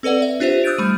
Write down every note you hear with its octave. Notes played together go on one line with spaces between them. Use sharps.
C4 A4 B4 D5 F#5
E5
D4 F4 G4 C5 E5
D#6 E6 F#6 G6 A6 D7
G3 A3 D#7